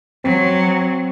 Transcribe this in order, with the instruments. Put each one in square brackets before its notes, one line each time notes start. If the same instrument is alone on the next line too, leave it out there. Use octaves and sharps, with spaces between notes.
[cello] F#3 [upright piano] C4